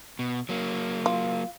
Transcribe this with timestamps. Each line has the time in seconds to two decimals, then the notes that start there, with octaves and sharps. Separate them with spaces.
0.19 B2
0.49 F#3 A#3
1.06 F4